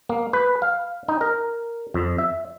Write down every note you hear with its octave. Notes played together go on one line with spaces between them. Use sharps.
A#3
B4
F5
D#4
A#4
F2
E5